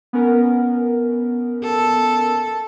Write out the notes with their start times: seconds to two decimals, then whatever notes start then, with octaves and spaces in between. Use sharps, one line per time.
0.13 B3 C#4 A#4
1.63 A4